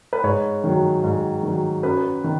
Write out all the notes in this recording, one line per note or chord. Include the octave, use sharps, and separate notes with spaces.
B4
G#2 C#5
D#3 F#3
G#2
D#3 F#3
F#2 B4
D#3